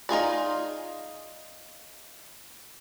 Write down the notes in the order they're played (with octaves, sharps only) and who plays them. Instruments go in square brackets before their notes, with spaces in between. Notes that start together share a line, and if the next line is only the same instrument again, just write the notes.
[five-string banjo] D#4 F4 G#4 D5